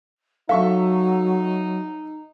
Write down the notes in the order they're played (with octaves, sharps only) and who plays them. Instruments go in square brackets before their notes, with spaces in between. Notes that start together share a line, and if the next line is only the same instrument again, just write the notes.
[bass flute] F#3 [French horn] D#4 [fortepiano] A4 E5 C#6 [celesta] F5